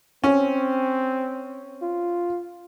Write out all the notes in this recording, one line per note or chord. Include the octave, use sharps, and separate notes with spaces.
C4 C#4
F4